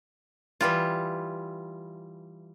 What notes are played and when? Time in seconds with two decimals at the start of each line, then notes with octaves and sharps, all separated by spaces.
0.61 E3 G3 F4